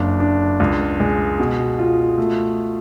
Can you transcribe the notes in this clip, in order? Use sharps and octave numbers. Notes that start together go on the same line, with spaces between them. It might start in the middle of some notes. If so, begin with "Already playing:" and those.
Already playing: F#1 D4
D4
C#2
G#3
B2
F4
A3